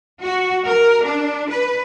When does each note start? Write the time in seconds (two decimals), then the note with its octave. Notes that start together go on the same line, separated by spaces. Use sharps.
0.22 F#4
0.66 A#4
1.03 D4
1.50 B4